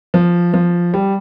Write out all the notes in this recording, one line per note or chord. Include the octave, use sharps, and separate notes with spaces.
F3
F3
G3